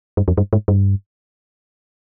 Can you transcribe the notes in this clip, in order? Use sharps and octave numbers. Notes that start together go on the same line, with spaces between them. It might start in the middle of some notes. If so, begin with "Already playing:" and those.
G2
F2
G2
G#2
G2